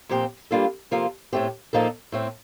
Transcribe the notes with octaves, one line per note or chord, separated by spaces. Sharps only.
A#2 F3 C4 G4
G3 A#3 D4 F4 A4
C3 F3 A#3 F4 A4
A2 A3 C4 G4
A#2 F3 A#3 D#4 A4
A2 A3 C4